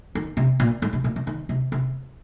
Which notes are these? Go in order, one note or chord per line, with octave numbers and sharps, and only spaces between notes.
D#3
C3
A#2
G#2
C3
A#2
C3
D#3
C3
C3